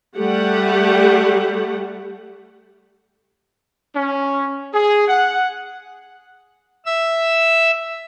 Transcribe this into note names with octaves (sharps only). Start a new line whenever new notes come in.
G3 A3 G4 F#5
C#4
G#4
F#5
E5 E6